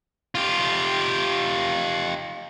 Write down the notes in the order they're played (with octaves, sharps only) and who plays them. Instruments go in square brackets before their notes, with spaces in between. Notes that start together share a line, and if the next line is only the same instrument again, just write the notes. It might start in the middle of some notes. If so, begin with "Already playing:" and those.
[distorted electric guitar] F4 G4